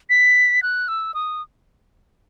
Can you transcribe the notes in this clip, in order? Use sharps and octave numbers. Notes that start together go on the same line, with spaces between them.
B6
F#6
E6
D#6